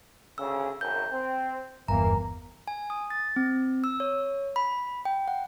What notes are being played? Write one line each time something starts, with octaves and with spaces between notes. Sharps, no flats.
D2 C#3 E6
G#1 F#2 G6
C4
G1 E2 E3 A#3 A#5
G#5
D#6
A6
C4
E6
C#5
B5
G5
F#5